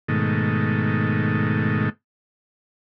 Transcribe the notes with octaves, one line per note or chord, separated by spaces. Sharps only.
G#2 B2 D#3 A3